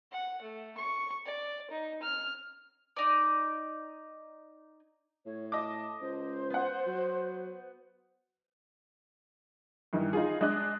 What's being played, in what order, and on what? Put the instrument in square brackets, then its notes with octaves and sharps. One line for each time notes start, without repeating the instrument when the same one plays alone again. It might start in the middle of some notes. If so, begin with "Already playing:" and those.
[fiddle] F#5
A3
C#6
D5
D#4
F6
[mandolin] D#4 D5
[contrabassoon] A2 [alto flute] C#5
[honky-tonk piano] D#5 D6 [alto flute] A5
[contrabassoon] C#2 [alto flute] C5
[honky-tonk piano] B3 F#5
[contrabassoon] F#3
[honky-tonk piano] G2 D#3 E3
D#4 F4 G#4
G#3 D4 D#5 F#6